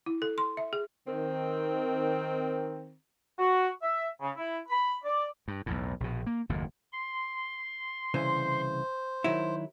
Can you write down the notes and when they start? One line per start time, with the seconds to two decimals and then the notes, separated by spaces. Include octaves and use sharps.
0.06 E4
0.22 A4
0.38 C6
0.57 E5
0.73 G#4
1.07 D#3 C4
3.39 F#4
3.83 E5
4.21 C#3
4.37 E4
4.69 B5
5.05 D5
5.48 G2
5.66 B1 E2 A2
6.00 A#1 B2
6.27 A#3
6.49 F#1 D#2 A2
6.92 C6
8.14 C2 C#3 E3 C5
9.24 D#3 F#3 E4